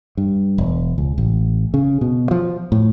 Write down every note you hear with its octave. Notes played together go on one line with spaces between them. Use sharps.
G2
E1
C#2
A1
C#3
B2
F3
A2